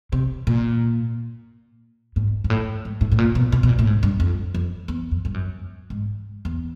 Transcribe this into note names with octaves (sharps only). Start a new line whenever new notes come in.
C3
A#2
G#2
G#2
A2
G#2
A2
A2
A#2
B2
B2
B2
A#2
A2
G#2
G2
F2
F2
E2
F2
G2
F#2
G#2
E2